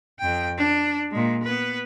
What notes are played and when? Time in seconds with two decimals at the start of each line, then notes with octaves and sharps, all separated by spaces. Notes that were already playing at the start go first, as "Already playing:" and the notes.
0.20 F2 G5
0.58 D4
1.11 A#2 G#3
1.43 B3 B4